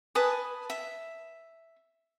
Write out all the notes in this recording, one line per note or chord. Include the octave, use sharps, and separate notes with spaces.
B4 G#5 A5 D#6
E5